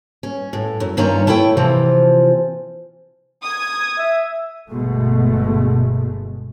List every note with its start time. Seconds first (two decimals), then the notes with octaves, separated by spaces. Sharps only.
0.23 C#4
0.53 A2
0.80 F#2
0.97 G2 D#3 C#4 F4 C#5 A#5
1.27 A3 E4 C#5 G5
1.57 C3 E3 F3 C4 F4
3.44 D#6 G#6
3.98 E5
4.69 G1 B2 G#3 A3